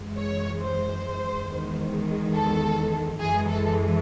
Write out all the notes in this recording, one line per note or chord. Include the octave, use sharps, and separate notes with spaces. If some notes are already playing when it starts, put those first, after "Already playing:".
Already playing: F#2 E3 G#3
C#5
C5
E2 D#3 G#3
A4
F#2 E3 G#3 G#4
A4